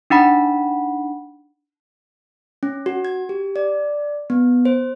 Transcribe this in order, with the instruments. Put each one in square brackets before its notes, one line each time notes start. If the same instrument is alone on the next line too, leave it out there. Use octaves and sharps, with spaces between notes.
[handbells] D4 D#4 F#5 B5
[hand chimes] C#4
F#4
G#6
G4
D5
B3
C5